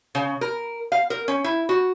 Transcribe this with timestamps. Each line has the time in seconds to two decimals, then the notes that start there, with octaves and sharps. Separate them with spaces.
0.15 C#3
0.41 A#4
0.92 F5
1.10 A#4
1.28 C#4
1.44 E4
1.69 F#4